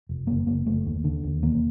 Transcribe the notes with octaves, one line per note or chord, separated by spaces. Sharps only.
F1
F#1 A#3
F#1 A#3
F#1 A3
D#2
D3
D#2
E1 A#3